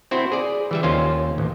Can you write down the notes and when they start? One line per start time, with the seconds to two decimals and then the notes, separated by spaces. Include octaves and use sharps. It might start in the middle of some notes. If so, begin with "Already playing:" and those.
0.11 C4 E4 F#4 C5
0.32 G#4 D5
0.71 E3 G3 E5
0.83 D#2 A#3 C#4 F4 C5
1.38 A1